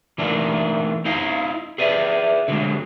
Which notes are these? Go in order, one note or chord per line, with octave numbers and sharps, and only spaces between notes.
E3 A3 A#3 D4 D#4
D#4 E4 D#5 F5
G#4 B4 D5 E5
D3 F#3 G#3